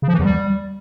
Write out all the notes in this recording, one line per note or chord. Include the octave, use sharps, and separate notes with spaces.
C#3
F3
E3
E2
G3